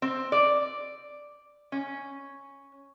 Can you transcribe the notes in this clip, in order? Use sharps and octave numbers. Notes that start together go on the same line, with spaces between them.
C4
D5
C#4